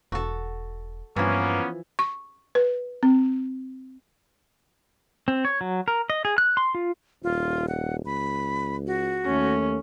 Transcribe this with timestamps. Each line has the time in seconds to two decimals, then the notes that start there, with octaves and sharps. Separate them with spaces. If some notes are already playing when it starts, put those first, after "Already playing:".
0.12 E1 F#4 A4
1.16 G2 E3 F3 A#3 B3 C#4
1.99 C#6
2.55 B4
3.03 C4
5.28 C4
5.45 C#5
5.61 F#3
5.88 A#4
6.10 D#5
6.25 G#4
6.38 F#6
6.57 C6
6.75 F4
7.24 D#1 F4
7.68 F#5
8.05 C#2 B5
8.87 F#4
9.26 D#2 A3 C#4